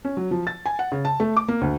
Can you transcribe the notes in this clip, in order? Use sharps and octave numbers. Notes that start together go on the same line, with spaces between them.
C#4
F#3
F3
A6
G#5
F#5
C#3
A5
A3
D6
A#3
D2